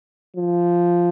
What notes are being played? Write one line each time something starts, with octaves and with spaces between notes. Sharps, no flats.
F3